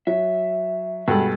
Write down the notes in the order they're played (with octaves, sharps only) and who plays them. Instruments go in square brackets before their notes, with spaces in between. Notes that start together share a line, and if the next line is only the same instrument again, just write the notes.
[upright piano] F#3 [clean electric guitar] E5
[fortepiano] G2 A4 [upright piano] B2 G#3 [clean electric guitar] F#4 B5